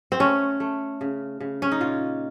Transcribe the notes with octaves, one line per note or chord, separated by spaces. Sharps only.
C4
A3 C#4
A3
C#3
C#3
C#4
D#4
A#2 F4